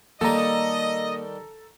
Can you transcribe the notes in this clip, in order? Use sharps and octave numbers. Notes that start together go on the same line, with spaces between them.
D#3 G3 A#3 A4 D#5 A#5